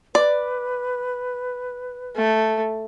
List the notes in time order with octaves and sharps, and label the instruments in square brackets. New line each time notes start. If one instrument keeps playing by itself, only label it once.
[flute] B4 [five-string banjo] D5
[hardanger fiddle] A3